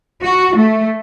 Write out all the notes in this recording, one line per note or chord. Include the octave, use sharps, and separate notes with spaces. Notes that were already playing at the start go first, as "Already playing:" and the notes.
F#4
A3